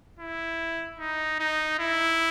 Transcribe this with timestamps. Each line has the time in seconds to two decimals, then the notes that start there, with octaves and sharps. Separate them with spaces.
0.19 E4
0.99 D#4
1.39 D#4
1.79 E4